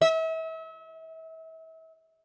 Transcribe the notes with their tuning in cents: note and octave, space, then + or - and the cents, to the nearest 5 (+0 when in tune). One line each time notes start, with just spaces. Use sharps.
E5 -35